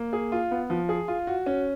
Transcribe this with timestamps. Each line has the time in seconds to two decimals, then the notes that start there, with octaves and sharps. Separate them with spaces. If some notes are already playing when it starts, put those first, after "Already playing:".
Already playing: A#3
0.13 G#4
0.32 F4
0.51 B3
0.70 F3
0.89 G#4
1.08 F4
1.27 F#4
1.46 C#4